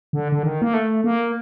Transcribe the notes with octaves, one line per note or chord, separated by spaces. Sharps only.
D3
D3
D#3
A#3
A3
A#3